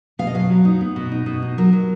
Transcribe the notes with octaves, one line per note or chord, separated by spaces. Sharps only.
B2 F5
D#5
F#3 F5
F#3
D#4
B3
B2
D#4
B2
D#4
F#3 A#4
F#3